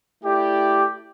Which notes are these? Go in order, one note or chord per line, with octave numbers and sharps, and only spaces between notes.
A3 E4 G4 D5